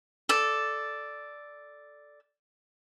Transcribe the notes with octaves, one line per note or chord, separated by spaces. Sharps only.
A4 D5